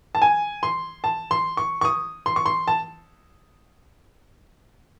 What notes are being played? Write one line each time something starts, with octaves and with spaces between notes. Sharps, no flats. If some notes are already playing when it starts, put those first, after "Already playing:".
A5
G#5
C6
A5
C6
C#6
C#6
D#6
C6
C#6
C6
A5